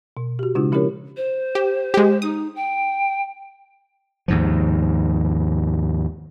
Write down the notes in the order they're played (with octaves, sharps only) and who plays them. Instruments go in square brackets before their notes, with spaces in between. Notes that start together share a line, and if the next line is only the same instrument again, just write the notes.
[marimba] B2
F#4 G4
C#3 G#3 D4 E4 F4
F3 C#4 E4 G4 A#4 C#5
[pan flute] C5
[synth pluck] G4
G#3 G4
[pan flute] D#4 [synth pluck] D#6
[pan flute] G5
[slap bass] D#2 G#2 F3